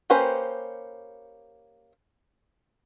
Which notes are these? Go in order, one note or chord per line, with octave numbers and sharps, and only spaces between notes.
A#3 C#4 G4 B4 C5